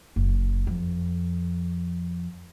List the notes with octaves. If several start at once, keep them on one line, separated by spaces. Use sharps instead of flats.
F#1
F2